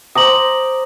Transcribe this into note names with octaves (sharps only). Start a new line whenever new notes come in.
C5 A#5 D6 D#6 F#7